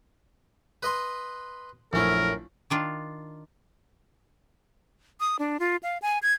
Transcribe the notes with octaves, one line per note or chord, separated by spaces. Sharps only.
B4 D#5 C6
A#1 F#2 A3 C#4 E4 A#4
D#3 D4 F4
D#6
D4
F4
F5
G#5
G#6